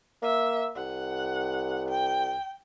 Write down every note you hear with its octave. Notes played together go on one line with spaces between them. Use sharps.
A#3 E5
C2 F#5
G5